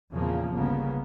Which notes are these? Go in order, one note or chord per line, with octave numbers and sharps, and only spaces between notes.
E2 A#2 C#3 F3 A#3 C4
G1 C#2 C#3 A#3 B3